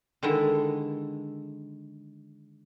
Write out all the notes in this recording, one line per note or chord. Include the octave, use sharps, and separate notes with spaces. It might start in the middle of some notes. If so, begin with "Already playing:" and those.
D3 D#3 G#3 E4